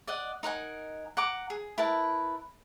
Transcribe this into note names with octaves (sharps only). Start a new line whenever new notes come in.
D5 D#5 F#5
D#4 A#4 F#5 G#5
F#5 A#5 D6
G#4
E4 A#4 B4 A5